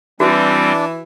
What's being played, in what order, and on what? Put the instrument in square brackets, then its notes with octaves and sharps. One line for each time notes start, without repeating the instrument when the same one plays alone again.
[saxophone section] E3 [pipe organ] G3 C4 [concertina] D4 [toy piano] F#4